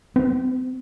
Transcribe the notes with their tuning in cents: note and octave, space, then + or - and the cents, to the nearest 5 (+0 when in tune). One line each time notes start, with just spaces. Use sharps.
C4 -40